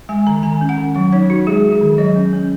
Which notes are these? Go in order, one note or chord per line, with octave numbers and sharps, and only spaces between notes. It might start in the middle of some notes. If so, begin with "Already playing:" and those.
G#3 G#5
D#3 A#5
D#3 G#5
C#4
F#5
D#3
F#3 F#5
D#4 C#5
D#4 F#4
G#3 G#4
G#3
G#4
D#3
F#3 D#5
C#4
C#4